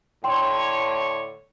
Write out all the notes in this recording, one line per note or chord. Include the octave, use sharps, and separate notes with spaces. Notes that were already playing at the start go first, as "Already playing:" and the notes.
A2 D3 C#5 G5 C6